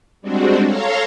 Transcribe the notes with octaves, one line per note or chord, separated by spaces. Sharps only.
G3 G#3 C4 D4 F#4
A4 C#5 F5 A#5 C6